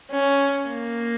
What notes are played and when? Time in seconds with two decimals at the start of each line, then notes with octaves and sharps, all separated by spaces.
0.12 C#4
0.70 A#3